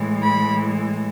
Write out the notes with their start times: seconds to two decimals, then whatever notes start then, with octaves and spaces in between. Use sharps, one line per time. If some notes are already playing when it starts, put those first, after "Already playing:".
Already playing: A2 E3 G#3
0.23 B5